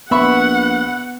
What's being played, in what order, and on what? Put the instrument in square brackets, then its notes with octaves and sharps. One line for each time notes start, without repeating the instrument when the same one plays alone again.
[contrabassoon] A#1 [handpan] B3 [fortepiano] E5 B5 C#6 [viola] F#5